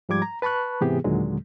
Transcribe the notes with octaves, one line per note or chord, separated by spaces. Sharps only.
G#2 F3 G3 D6 G#6
A#5
B4 A5 B5 C#6 F#6
G#2 C3 E3 B3 G4 G#4
D#2 A#2 D3 F#3 G#3